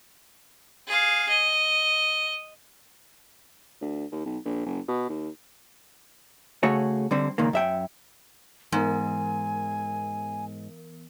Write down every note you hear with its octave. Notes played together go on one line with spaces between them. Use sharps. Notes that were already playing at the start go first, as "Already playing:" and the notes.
G#4 F5
D#5
D2
D#2
B1
A#1
F#1
B2
D#2
C#3 A3 F#4 G#4 C#5
D3 G3 C4
C#2 A#2 D#3 A#3
F#2 E5 G5
G#2 E3 B3 A#4 G#5